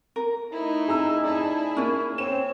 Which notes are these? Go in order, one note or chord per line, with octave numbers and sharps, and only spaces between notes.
A#4
A3 D#4 E4
G#4 A#5 E6
E4 G#4 D5 A5
A#3 C#4 F4
C4 C#5 E7